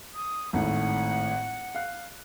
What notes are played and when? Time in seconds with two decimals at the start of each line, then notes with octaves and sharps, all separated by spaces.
0.14 D#6
0.53 G#1 A2 F#5
1.75 F5 F#6